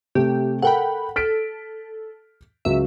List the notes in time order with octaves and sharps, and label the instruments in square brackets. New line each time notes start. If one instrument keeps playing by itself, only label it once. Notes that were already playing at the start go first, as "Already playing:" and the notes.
[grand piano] C3 A3 [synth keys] G4
[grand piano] A4 A#4 [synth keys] F#5 G5 B5
[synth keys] A4 [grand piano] F6 B6 D7
[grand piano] C#2 F#3 [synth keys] E5